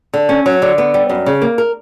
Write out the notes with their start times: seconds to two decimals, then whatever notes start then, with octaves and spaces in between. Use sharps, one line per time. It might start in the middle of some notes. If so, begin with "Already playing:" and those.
0.14 D3
0.29 C#4
0.46 F#3
0.62 D3
0.78 B3
0.94 G3
1.09 F#2
1.26 C#3
1.42 A#3
1.58 A#4